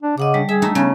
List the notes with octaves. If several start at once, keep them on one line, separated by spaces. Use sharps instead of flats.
D4
C#3 D#5 F#5 D6
D3 G3
G#4 E5
A3 D#4 E4
C#3 B3 C#4